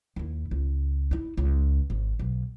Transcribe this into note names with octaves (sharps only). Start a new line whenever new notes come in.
D#2 E4
C#2
D#4 E4
C#2
G#1
B1